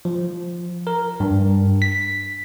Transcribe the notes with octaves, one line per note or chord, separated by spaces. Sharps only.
F3
A#4
G2
B6